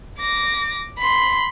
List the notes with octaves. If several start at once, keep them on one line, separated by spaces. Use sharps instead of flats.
D6 A#6
B5 C6